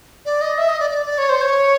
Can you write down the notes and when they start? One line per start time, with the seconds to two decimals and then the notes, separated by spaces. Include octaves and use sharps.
0.25 D5
0.41 D#5
0.58 E5
0.69 D#5
0.80 D5
0.90 D5
1.06 D5
1.18 C#5
1.29 C5
1.41 C#5